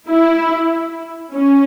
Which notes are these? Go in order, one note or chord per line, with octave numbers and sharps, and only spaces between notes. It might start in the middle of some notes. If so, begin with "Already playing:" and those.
E4
C#4